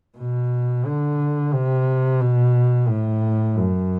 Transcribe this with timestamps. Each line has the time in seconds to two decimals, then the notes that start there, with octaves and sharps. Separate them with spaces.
0.18 B2
0.86 D3
1.53 C3
2.21 B2
2.87 A2
3.55 F#2